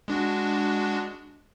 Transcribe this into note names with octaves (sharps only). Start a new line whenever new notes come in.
G#3 D4 F#4